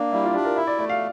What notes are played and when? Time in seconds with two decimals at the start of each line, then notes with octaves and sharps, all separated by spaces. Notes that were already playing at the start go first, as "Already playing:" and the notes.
Already playing: A#3 D4
0.12 G3 E4
0.24 F4
0.34 D4 G4
0.45 A#4
0.56 E4 E5
0.67 D5
0.78 A3 D5
0.89 F5